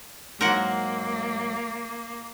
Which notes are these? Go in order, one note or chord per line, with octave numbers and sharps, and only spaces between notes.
G#2 F#3 A#3 A#4 F#5